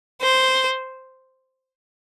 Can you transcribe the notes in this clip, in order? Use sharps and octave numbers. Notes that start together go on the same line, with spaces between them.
C5